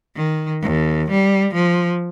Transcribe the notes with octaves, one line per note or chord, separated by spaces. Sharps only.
D#3
D#2
G3
F3